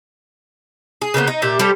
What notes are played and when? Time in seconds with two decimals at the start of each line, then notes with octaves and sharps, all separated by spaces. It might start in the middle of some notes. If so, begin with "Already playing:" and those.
1.02 G#4
1.14 C#3 A#3 B3 C5
1.27 D#4
1.42 A#2 G4 E5
1.59 G3 G4 A4 C5